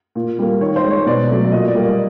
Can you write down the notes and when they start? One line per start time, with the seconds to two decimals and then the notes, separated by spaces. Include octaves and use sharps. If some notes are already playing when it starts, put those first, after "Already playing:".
0.15 A#2
0.39 G3 A#3
0.60 D#3 C#5
0.76 C5
0.84 G#3
0.91 C#5
1.06 B2 D5
1.29 F#3 A3
1.45 D5
1.52 A#2 D#5
1.68 D5
1.75 G3 A#3
1.83 D5